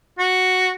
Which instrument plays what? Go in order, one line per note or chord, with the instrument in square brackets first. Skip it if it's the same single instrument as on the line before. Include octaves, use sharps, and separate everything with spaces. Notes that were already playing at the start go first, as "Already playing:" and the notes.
[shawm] F#4